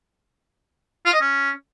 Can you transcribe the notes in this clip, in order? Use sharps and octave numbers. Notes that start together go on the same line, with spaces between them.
F4
D#5
C#4